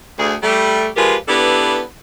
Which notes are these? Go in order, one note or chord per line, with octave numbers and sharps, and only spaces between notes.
D2 G#4
G3 A3 G4
F3 G#3 F4 G4 A#4 B4
B3 D4 E4 G4 A4 B4